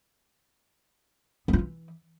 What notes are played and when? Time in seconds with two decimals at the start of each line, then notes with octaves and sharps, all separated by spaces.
1.48 B3
1.53 F4
1.58 E3